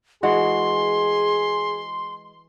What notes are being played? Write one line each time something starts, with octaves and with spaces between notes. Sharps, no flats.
E3 G#3 F#4 G#4 C6